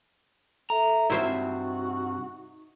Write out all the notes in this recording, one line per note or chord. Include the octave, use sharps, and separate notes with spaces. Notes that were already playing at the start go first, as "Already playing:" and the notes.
A4 E5 A#5
G2 C3 D#4 E4 F#4 C5 E5